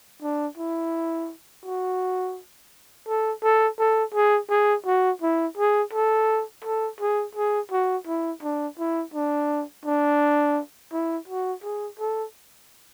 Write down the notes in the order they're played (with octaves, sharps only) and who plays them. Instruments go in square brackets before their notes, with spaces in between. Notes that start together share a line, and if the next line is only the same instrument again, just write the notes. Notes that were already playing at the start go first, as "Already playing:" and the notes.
[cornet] D4
E4
F#4
A4
A4
A4
G#4
G#4
F#4
E4
G#4
A4
A4
G#4
G#4
F#4
E4
D4
E4
D4
D4
E4
F#4
G#4
A4